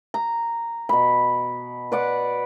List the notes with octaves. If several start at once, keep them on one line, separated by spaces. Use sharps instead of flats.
A#5
B2 B5
B4 D5 F#5